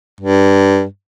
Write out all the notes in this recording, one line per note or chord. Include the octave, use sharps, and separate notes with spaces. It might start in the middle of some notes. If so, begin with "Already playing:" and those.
G2